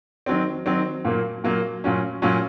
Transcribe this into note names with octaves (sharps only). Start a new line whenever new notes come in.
D#3 F#3 C4
D#3 F#3 C4
A#2 F#3 A#3
A#2 F#3 A#3
A#2 F#3 C#4
A#2 F#3 C#4